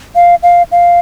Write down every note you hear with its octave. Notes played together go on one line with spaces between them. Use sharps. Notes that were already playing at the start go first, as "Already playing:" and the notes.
F5
F5
F5